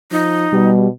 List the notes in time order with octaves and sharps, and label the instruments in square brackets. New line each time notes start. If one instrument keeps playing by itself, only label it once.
[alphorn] F3 [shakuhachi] D#4
[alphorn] B2 [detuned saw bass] G3